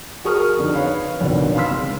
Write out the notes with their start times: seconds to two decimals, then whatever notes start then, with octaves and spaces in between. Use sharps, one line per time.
0.24 F#4 G#4 A#4 C#6 D#6 F6
0.57 F2 D3 D#4
0.74 B4 C#5 F5 B5
1.21 A1 F2 B2 D3 D#3
1.55 F5 B5 C6 E6 B6
1.71 C#2